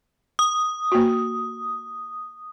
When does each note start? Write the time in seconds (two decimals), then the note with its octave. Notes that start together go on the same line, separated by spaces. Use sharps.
0.39 D#6
0.92 A#3 F#4